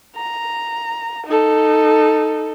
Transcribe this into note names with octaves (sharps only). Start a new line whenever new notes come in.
A#5
D#4 A4